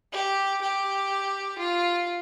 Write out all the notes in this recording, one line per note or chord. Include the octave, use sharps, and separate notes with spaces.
G4
G4
F4